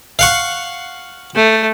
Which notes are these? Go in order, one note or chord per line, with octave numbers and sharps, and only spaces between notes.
F5 F#5 C#6
A3